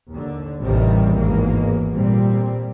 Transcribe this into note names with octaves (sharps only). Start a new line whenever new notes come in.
D#2 D3
A1 D#2 C3 D#3 G3
G#1 E2 G#2 A#3
A#2 G3 C4